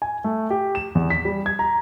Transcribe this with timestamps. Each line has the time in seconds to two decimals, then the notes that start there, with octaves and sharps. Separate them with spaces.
0.02 G#5
0.24 A3
0.50 G4
0.75 E7
0.95 E2
1.10 B6
1.25 G3
1.46 G#6
1.59 A#5